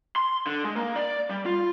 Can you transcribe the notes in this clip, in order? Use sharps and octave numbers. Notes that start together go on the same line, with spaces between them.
C6
D3
G#3
A#3
D5
G3
F4